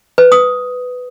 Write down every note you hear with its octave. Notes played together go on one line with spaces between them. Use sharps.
B4
D#6